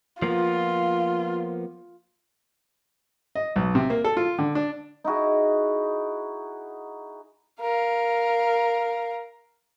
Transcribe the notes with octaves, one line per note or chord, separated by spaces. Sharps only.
F3 A#3 B3 F4
D#5
B1
C3
A#3
A4
F4
D3
D4
D#4 E4 F#4 G#4
A#4 F5